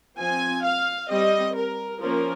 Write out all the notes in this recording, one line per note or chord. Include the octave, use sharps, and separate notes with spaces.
F3 C4 G#5
F5
G3 C4 D#5
A#4
F3 A#3 C#4 A#4